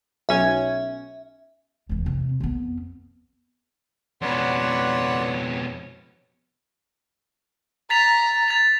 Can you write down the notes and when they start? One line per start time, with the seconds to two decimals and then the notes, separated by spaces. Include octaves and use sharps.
0.29 B1 C#4 E5 G#6
1.89 F1 E2
2.06 C3
2.40 F2 B3
4.21 F2 B2 B4 C#5 D5 F#5 C6
7.90 A#5 A6 B6 F7
8.48 A6 F7